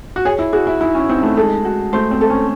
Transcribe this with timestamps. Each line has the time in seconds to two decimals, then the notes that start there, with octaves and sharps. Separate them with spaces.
0.16 F#4
0.25 G#4 C#5
0.39 E4
0.53 F#4 G#4
0.67 E4
0.81 D#4 E4
0.95 C#4
1.09 C4 D#4
1.23 A3
1.37 G#3 A4
1.65 F#4
1.93 A3 C5
2.11 C4
2.21 A4
2.30 C#4